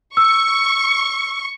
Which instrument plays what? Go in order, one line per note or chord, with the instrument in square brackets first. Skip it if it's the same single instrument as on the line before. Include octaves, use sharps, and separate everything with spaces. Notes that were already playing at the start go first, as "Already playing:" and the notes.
[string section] C#6 [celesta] E6